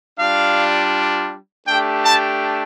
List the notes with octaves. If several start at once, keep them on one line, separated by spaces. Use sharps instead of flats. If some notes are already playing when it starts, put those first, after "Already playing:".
G3 D4 F4 F5
A3 D4 G4 G5
A5